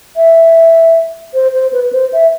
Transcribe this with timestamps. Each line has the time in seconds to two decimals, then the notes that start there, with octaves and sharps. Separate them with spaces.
0.16 E5
1.34 C5
1.54 C5
1.73 B4
1.84 B4
1.93 C5
2.13 E5